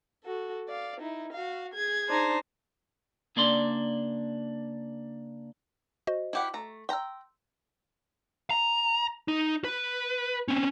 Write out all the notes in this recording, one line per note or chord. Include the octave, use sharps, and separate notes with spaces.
F#4 A4
D5 F5
D#4 E4
F#4 F5
G#4 G#6
D4 D#4 C5
C#3 A#3 D4 D5 C6
F#4 C5 D#5
E4 G4 F#5
A3 A#5
G5 A#5 C6 E6
A#5
D#4
B4
C4 C#4